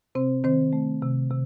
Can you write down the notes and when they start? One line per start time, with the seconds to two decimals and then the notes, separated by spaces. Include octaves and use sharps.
0.15 C3 C4 C5
0.44 D#3 C4 C5
0.73 A3
1.02 C3
1.30 C3